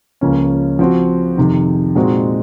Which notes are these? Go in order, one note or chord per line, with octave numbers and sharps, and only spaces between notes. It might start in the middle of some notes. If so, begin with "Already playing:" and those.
C#2 C#3 F3 A#3 C#4
F3 C4 F#4
F2 C3 D#3
A#2 G#3 C4 D#4 F#4